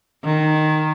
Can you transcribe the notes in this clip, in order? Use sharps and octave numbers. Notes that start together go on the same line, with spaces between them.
D#3